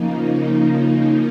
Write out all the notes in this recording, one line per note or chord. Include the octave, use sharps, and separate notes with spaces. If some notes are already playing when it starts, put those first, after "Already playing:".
Already playing: C#3 F3 A#3 D#4